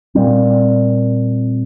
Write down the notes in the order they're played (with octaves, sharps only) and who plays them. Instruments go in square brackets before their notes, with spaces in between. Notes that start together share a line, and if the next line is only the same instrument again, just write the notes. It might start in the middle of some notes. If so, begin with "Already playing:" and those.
[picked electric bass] A#2 G3 C4